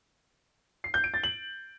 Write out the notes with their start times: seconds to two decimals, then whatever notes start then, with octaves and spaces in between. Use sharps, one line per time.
0.84 C7
0.94 G6
1.04 D7
1.14 A6
1.23 F#7